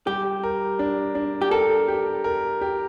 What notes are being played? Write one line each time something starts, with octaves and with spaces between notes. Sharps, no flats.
G3 G4
A#4
D4
D4
G4
A4 A#4
G4
A#4
G4